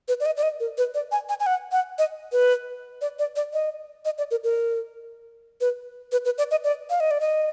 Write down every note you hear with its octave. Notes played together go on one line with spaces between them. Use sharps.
B4
D5
D#5
D5
D#5
A#4
B4
D5
G#5
G#5
G#5
F#5
F#5
D#5
B4
D5
D5
D5
D#5
D#5
D5
A#4
A#4
B4
B4
B4
D5
D#5
D5
F5
D#5
D5
D#5